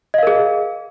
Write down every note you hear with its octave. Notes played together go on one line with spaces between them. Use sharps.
G#4 A#4 D#5 F5